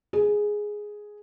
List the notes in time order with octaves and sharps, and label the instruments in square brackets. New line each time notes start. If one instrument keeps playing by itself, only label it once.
[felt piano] G#4